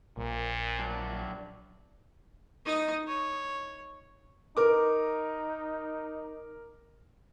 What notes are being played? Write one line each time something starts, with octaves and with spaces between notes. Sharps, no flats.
A#1 A#2
F#3 D4
D#4 D#5
C#5
D#4 A#4 D6